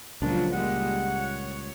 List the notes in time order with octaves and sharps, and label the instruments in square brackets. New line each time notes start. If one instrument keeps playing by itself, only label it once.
[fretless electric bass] C#2 A#2 [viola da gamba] F3 F#3 F4 [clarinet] D4
[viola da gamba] G3 G#3 A#3 [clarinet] F#5
[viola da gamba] C#5